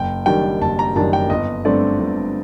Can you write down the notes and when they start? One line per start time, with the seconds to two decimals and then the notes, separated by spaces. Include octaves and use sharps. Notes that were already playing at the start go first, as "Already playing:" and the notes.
Already playing: F#1 G5
0.26 F#2 D#3 G3 D4 G5
0.61 F#1 A5
0.79 A#5
0.95 F#2 D#3 G3 D4 A5
1.13 G5
1.30 G1 D#5
1.65 G2 D3 A3 C4 D5
2.00 G1